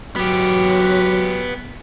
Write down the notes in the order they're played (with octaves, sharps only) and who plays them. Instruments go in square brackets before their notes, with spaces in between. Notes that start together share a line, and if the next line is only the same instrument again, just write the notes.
[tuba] F#3 [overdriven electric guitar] B3 G4